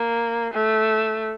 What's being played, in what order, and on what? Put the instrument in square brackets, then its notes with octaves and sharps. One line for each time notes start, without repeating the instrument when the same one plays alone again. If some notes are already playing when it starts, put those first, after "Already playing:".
Already playing: [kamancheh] A#3
A3